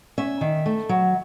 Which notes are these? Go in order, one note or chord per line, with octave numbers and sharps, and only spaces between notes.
C#4 E5
D#3
A3
F#3